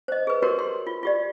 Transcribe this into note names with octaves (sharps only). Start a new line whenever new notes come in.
C5 D#5
G#4 B4
F#4 G4 A#4 B4 C#5
C6
F4
F4 G4 D5